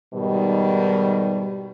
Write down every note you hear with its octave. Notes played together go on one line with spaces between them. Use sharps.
G#2 B2 D#3 G3